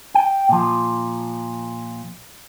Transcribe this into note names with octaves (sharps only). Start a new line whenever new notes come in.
G5
A#2 F3